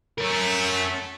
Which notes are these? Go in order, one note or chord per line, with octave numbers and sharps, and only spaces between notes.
A3 C#4 A#4